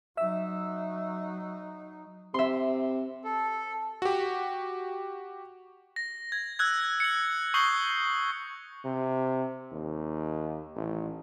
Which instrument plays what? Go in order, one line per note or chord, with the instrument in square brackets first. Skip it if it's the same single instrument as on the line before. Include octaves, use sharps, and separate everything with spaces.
[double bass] F#3 D#4 [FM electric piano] E5 E6
[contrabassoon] C3 [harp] E5 C6
[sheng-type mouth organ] A4
[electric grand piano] F#4 G4
[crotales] A#6
G#6
E6 F#6 G#6
C#7 F#7
C#6 D#6 G6 C7 F#7 G7
[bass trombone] C3
D#2
A1